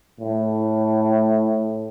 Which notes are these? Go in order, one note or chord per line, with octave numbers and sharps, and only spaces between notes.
A2